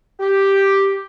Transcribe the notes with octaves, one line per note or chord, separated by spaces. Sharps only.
G4